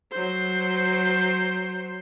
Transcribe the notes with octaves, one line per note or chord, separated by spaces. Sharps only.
F#3 C5